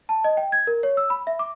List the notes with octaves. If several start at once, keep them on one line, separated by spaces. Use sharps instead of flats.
A5
D#5
G5
G#6
A#4
C#5
E6
B5
E5
D6